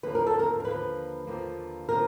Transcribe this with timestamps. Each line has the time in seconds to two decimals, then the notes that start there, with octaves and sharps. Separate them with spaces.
0.03 D#2 D3 F3 A#3 B4
0.15 A#4
0.27 A4
0.39 A#4
0.60 A#4
0.64 D#2 D3 F3 A#3 B4
1.27 D#2 D3 F3 A#3
1.89 D3 F3 A#3 A#4